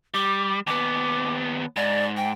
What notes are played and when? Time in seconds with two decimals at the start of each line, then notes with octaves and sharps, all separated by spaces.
0.14 G3 D6
0.67 D#2 B3 D6
1.76 G#2 D5
2.17 G5